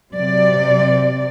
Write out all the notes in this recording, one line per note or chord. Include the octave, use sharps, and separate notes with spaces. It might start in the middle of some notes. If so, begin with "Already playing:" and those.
C3 F#3 D5